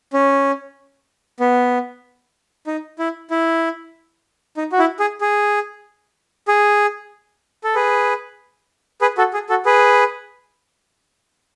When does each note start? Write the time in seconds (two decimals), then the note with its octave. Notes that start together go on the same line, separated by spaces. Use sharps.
0.13 C#4
1.40 B3
2.67 D#4
2.99 E4
3.31 E4
4.57 D#4
4.72 F#4
4.79 E4
5.00 G#4
5.21 G#4
6.48 G#4
7.64 A4
7.75 G#4 B4
9.01 G#4 B4
9.18 F#4 A4
9.34 G#4
9.49 F#4 A4
9.66 G#4 B4